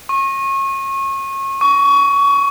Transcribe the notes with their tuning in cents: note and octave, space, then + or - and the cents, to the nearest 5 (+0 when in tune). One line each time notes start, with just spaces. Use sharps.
C#6 -30
C#6 +25